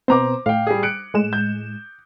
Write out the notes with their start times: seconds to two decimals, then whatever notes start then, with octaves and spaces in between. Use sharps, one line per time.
0.08 B2 B3 C4 C5 A#5 D6
0.46 A2 F5 G5
0.67 G3 G4 G#4
0.83 F#6 C#7 D7
1.14 A2 G#3 E7
1.33 G6